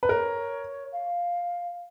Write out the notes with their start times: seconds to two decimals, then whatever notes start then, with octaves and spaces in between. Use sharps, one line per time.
0.03 B4
0.09 A#4 C#5
0.93 F5